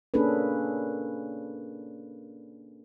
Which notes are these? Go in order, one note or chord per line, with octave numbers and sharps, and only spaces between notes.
A#3 C#4 D4 G#4 A4 B4